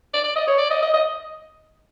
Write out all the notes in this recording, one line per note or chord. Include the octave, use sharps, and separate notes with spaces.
D5
D5
D#5
C#5
D5
D#5
D#5
D#5